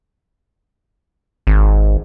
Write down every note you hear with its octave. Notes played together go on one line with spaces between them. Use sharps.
G#1